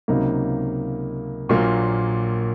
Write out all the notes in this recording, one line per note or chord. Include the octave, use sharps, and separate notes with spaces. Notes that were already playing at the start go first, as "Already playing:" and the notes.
C#2 C3 F#3 A#3 D#4
A#1 A#2 F#3 A#3 F4